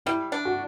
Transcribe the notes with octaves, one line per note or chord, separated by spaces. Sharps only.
G3 E4
D4
F#4